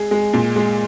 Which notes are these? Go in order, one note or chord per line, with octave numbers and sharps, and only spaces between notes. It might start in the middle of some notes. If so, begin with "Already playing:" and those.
Already playing: G#3 G#4
G#3
A#2
G#3